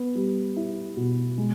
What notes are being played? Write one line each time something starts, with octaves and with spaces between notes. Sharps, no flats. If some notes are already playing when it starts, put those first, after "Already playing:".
Already playing: B3
G3
E4
B2
G#3